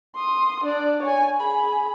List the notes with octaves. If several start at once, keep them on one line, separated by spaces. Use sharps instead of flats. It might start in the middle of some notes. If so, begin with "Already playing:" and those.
C6 D#6
D4 D5
C#5 G#5
G#4 B5